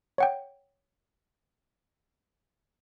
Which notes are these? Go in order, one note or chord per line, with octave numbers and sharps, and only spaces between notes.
C#5 F#5 G5